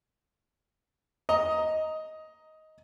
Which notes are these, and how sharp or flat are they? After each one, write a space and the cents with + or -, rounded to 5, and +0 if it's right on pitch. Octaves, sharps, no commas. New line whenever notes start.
D#5 +10 A#5 +0